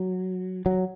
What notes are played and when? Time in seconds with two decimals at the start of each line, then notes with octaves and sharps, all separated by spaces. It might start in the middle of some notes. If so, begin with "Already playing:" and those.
Already playing: F#3
0.66 F#3